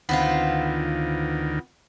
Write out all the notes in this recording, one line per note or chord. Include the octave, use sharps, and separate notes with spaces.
D2 D#3 B3 C4 F4